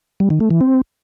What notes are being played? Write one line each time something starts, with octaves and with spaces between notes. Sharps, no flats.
G3
D#3
A3
E3
C4